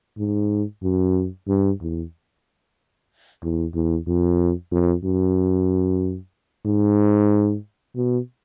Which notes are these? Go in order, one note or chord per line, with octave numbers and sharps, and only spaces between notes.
G#2
F#2
G2
E2
E2
E2
F2
F2
F#2
G#2
B2